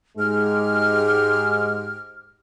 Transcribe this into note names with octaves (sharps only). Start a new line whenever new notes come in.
G#2 G#3 G4 F6